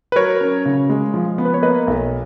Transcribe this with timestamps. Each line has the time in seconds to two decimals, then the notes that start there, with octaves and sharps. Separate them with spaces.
0.12 B4
0.16 F#3 A#4 C#5
0.41 C#4
0.65 C#3
0.89 G#3
1.14 F3
1.38 B3
1.45 B4
1.54 C#5
1.62 A#3 B4 D#5
1.87 B1